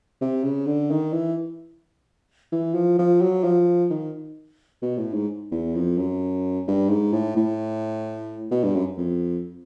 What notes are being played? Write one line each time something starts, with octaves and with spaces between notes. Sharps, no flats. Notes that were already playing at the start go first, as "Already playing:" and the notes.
C3
C#3
D3
D#3
E3
E3
F3
F3
F#3
F3
D#3
B2
A2
G#2
E2
F2
F#2
G2
G#2
A2
A2
B2
G2
F#2
F2